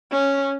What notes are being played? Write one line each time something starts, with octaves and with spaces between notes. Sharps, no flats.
C#4